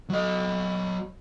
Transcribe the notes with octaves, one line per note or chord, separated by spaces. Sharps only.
F#3 D#5